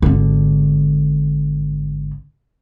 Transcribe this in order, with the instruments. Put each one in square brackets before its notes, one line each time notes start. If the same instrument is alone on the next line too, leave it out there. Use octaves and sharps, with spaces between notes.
[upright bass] G#1 D3